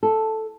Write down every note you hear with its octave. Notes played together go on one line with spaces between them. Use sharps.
A4